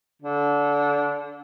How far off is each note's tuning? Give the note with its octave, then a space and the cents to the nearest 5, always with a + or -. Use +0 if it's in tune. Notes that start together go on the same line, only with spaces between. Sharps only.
D3 -25